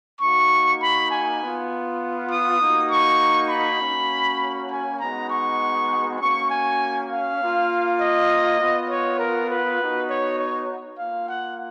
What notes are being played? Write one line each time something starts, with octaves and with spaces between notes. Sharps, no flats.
A#3 D#4 F#4 C#6
B5
G#5
B3 F4
D#6
A#3 D#4 F#4
C#6
B5
A#3 C#4 F#4
G#5
G#3 B3 D#4 F#4 A#5
C#6
A#3 C#4 F#4 C#6
G#5
F5
A#3 F4
D#5
B3 F4
C#5
A#4
B4
B3 D#4 F#4
C#5
C#5
A#3 F4 F5
F#5